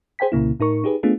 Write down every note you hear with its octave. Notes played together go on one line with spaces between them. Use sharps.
G#4 C5 G5 G#5 B6
C2 A#2 C#3 A#3 E4
A2 D#4 A#4 C#6
D#4 G4 G#4 B4
A3 B3 D4 F4 G#4